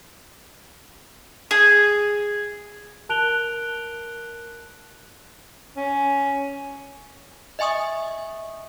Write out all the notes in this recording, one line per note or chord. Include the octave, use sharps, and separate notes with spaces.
G#4
A#4 A5 F#6 D7 F7 G7
C#4
D#5 E5 G#5 C#6 D#6